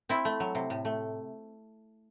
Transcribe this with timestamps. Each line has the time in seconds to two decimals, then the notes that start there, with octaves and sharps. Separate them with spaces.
0.09 C4 E4
0.25 A3
0.40 F#3
0.55 C3
0.70 A2
0.85 A3